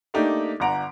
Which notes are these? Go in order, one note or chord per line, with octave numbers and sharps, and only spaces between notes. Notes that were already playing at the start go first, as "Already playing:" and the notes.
A3 A#3 D4 D#4 G4
G1 D4 F#5 A#5 D7